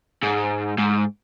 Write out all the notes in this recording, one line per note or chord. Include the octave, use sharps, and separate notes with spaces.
G#2
G#2